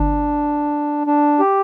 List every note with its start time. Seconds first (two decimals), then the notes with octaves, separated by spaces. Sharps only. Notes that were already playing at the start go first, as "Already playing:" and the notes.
Already playing: G1 D4
1.07 D4
1.40 G4